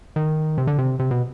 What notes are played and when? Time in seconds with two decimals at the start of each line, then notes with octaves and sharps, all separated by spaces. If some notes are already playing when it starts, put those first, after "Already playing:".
0.16 D#3
0.58 C3
0.67 D3
0.78 C3
0.99 C3
1.11 B2